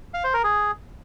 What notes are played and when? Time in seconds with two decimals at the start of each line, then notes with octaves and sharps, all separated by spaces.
0.14 F5
0.24 C5
0.34 A#4
0.44 G#4